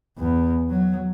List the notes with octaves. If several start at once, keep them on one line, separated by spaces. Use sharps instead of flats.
E2
F#3